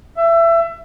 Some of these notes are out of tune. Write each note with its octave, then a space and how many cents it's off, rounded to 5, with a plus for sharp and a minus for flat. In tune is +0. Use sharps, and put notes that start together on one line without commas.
E5 +25